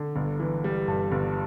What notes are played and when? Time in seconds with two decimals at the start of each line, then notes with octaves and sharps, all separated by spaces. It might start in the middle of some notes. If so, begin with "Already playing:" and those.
Already playing: D3
0.16 G1
0.40 E3
0.64 G3
0.88 G2
1.12 G1